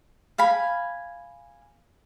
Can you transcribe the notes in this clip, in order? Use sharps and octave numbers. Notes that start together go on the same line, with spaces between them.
F5 G#5 B5